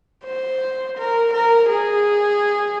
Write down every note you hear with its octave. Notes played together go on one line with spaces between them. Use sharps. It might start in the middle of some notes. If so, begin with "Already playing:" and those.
C5
A#4
A#4
G#4